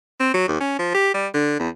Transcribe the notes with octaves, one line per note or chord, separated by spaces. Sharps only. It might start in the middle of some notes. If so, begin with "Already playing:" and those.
C4
F#3
D#2
C#4
F3
G4
G3
D3
E2